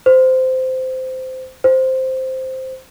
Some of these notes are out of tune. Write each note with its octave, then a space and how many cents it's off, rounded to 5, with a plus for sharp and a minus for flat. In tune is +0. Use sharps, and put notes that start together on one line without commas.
C5 -15
C5 +0